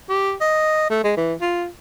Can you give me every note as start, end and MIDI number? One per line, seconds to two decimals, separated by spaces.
0.10 0.33 67
0.41 0.89 75
0.90 1.00 57
1.04 1.13 56
1.17 1.34 52
1.41 1.67 65